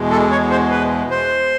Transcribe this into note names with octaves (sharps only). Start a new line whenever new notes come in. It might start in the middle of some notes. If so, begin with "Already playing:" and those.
Already playing: E2 B2 G#3
A4
C#5
C5
B4
C5